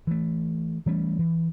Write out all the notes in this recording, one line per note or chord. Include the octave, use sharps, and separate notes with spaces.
E3 A3
E3 G3 A3 C#4
E3